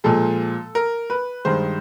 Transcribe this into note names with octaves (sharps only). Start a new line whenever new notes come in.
A#2 F3 G#3 A4
A#4
B4
G2 D#3 G#3 C5